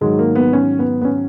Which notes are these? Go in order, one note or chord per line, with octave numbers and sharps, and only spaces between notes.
G#2 D#3 F#3 G#3
A#3
B3
C#4
B3
B3
C#4